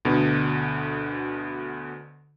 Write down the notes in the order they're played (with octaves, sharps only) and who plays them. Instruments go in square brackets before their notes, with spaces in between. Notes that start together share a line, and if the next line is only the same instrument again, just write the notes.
[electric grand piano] D2 B2 D3 B3